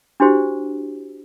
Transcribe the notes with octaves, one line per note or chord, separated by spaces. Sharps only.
D4 E4 F#4 G4 C5